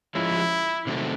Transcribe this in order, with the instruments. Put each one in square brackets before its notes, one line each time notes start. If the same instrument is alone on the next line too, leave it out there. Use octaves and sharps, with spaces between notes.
[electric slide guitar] F3 G#3 C#4 [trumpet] E4
[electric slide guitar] C3 D#3 F#3 A3 C4